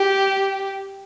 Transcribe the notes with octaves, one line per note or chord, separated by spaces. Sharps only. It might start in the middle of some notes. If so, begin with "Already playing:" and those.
Already playing: G4